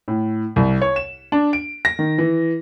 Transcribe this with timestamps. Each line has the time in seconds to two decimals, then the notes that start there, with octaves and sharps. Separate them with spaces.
0.08 A2
0.56 C2
0.81 C#5
0.96 E7
1.32 D4
1.53 D7
1.85 A#6
1.99 D#3
2.18 E3